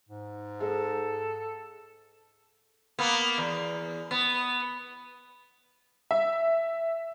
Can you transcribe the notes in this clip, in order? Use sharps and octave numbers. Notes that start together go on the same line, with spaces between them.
G#2
G#3 A4
A#3 B3
E2
B3
E5